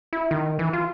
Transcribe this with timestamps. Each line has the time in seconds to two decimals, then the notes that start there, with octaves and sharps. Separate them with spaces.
0.13 E4
0.31 D#3
0.59 E3
0.73 F4